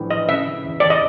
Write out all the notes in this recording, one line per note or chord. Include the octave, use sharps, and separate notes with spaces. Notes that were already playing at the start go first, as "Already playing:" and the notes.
Already playing: A#1 A2 E3
E3 D#5
C#3 E5
C#3
E2
E2 D5
D#5